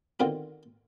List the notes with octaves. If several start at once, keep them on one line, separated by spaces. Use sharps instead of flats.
B2 D3 D#3 C4 F4 F#4